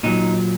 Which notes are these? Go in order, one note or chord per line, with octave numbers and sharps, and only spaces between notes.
A#2 F#3 D#4